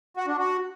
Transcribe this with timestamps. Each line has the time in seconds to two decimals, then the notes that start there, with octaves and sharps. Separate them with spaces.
0.17 F#4
0.28 D4
0.38 F#4